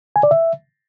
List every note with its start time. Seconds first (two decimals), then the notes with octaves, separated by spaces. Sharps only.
0.16 G#5
0.23 D5
0.31 E5